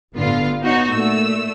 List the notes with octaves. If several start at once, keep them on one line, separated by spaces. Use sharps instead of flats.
G1 A2 D3 B3 F4 F5
B3 D#4 F#4 C#5
A#2 A3 E6